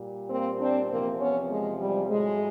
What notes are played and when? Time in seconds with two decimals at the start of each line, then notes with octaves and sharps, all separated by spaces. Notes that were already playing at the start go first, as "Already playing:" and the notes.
Already playing: A#2 G3
0.29 A#3 C4
0.60 C4 D4
0.90 E2 C3 F3 A#3 C4
1.19 B3 C#4
1.50 G#3
1.79 G3
2.10 A2 F#3 G#3